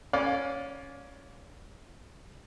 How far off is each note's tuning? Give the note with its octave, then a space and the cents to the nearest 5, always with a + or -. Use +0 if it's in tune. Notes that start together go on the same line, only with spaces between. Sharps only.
C#4 +0 D5 -15 F5 +25